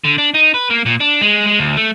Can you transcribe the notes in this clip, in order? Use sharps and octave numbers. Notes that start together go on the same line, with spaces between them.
D3
D4
D#4
B4
A#3
A#2
D4
G#3
G#3
D2
A3